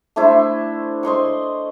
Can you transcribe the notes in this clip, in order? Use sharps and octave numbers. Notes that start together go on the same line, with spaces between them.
A3 D4 E4 C5
C5 D#5 C6 C#6